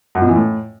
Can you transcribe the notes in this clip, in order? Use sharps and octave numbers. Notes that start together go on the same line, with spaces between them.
F#2
B2
E3
A2